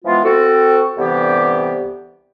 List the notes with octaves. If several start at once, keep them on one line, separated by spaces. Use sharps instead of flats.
E3 F3 G#3 B3 F4
C4 F#4 A4
C2 D3 E3 B3 G4